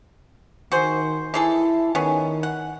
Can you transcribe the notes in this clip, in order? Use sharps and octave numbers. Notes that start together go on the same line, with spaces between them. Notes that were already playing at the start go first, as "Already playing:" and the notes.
D#3 F#4 G#4 C5
E3 E4 G#4 A4
D#3 B3 C#4 G#4
F#5